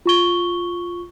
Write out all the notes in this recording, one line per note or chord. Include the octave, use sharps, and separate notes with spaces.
F4 C#6 G7